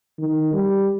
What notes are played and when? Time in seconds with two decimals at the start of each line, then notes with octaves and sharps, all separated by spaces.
0.19 D#3
0.53 G3